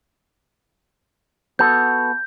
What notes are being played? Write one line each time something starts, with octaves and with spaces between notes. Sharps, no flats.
B3 F#4 A4 G6